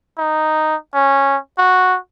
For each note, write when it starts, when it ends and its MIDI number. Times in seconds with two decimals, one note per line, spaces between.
0.18 0.76 63
0.94 1.37 61
1.58 1.98 66